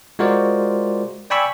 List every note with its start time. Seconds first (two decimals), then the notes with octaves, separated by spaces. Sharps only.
0.19 G#3 F4 F#4 A#4 C5 D5
1.30 D5 G5 G#5 B5 C#6 E6